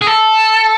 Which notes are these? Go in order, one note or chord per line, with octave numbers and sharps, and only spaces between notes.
G#4
A4